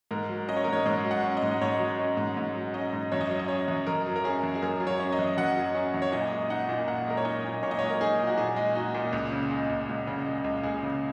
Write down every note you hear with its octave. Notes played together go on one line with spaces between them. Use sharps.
G#2 A#4
F#3
C#4 D#5
C#5
A#4
G#2 C#5
G#2 C#5
F#3
F#5
C#4
D#5
G#2
D#5
G#2 C#5
F#3
C#4
G#2
G#2
F#3
C#4 D#5
G#2
F#2 C#5
D#5
F#3 C#5
D#5
C#4 C#5
F#2
F#2 A#4
F#3
A#4
C#4 G#4
F#2
G#4
F#2 A#4
F#3
C#5
C#4
D#5
F#2
F#2 F#5
F#3
C#4
F#2
C#5
A#2 D#5
G#3
D#4 F#5
A#2
A#2 F#5
G#3 A#4
C#5
D#4 D#5
A#2
A#2 C#5
D#5
C#5
G#3
A#4
D#4 G#4
A#2
F#4
A#2 G#4
G#3
D#4 F#4
A#2
C#2
C#3
G#3
C#2
C#2
C#3
G#3
C#2
C#2 G#4
C#3